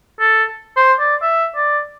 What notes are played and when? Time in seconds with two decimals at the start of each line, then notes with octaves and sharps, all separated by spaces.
0.20 A4
0.77 C5
0.99 D5
1.22 E5
1.56 D5